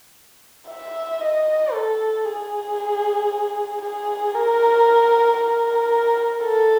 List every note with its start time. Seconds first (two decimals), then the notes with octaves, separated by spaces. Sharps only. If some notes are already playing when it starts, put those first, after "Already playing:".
0.68 E5
1.21 D#5
1.73 A4
2.25 G#4
3.82 G#4
4.34 A#4
5.39 A#4
6.43 A4